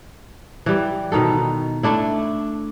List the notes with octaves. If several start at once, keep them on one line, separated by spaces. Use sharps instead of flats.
E3 G3
B2 D#3 D#4 A4
A3 D4 E4